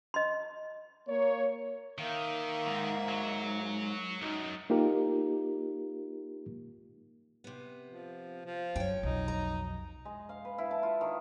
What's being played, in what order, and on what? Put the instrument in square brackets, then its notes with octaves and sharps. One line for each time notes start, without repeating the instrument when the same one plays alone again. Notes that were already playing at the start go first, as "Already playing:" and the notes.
[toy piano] D#5 C6
[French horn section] A#3 C#5
[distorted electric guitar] D#3 [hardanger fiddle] A#3 E5
[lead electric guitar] G#2
[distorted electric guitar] F#3
[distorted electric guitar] B1 F#2 [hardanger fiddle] D#4
[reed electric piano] A#3 D#4 F4 G4 A#4
[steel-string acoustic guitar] C3 B3
[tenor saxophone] F3
F3
[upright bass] F#2 [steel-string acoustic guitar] C#5 G5
[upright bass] B1 F2 [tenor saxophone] D#4
[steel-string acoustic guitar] A#5
[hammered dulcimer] G#3
F5
B4
E4
A5
F4
D#3